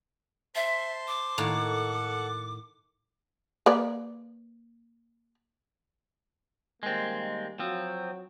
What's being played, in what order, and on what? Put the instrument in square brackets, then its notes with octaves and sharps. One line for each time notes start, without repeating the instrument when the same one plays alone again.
[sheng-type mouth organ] C5 A5 C6 [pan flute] E5
[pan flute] D6
[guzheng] A2 D#3 A#3 [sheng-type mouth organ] A4 F#5
[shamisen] A#3 B4 D5
[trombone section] D#3 G3 A#3 [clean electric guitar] G#3 C4
[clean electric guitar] F3 C4 [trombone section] F#3